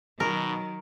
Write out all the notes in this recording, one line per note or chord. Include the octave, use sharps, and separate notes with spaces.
B2 D#3 F#3 A#4